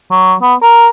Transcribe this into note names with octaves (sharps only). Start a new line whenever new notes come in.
F#3
B3
A#4